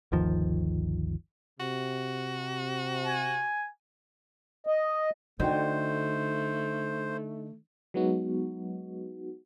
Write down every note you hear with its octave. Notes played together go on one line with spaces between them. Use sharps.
G1 D2 D#3 F3
C3 F#4
G#5
D#5
D3 A3 D#4 F#4 C5 G5
F#3 G#3 B3 D#4 F#4